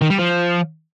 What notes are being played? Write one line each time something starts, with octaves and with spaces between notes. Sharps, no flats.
D#3
G3
F3